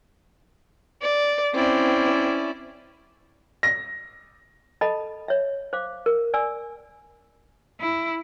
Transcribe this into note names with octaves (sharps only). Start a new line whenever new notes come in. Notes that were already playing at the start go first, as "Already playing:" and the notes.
D5
C4 C#4 E4 D5
A#6
A4 D#5 A5 B5
C#5 E5
C5 F5 D6
A#4
D5 G#5 E6
E4